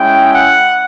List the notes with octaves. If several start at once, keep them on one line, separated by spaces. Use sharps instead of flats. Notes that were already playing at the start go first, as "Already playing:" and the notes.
Already playing: G#3 C#4 E4 G5
F#5